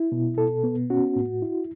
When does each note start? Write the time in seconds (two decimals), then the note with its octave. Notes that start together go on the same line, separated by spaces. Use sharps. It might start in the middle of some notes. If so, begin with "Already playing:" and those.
Already playing: E4
0.12 B2
0.37 B2 A4
0.64 B3
0.90 C#4 F#4
1.16 A2
1.42 E4